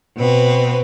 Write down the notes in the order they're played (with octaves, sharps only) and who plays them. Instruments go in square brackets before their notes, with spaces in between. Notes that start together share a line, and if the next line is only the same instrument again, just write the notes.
[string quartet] B2 C4 B4